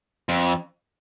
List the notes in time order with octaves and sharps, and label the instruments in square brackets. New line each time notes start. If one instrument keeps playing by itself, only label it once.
[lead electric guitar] F2